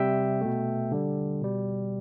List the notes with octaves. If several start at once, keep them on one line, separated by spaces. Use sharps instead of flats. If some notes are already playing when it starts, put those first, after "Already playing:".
Already playing: C3 G3 E5 G5
B2 A3
D3 G3
B2 G3